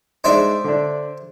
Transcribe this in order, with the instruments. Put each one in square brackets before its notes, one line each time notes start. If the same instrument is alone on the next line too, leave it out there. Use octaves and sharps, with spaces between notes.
[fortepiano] G#3 D4 D#4 [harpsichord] C5 D5 E5
[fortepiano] D3 D4